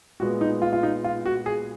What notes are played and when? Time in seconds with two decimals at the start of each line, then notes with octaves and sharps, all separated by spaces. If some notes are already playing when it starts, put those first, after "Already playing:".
0.20 A#2 G#3 B3 F#4
0.41 D#4
0.62 F4
0.73 F4
0.83 D#4
1.04 F4
1.26 F#4
1.46 G#4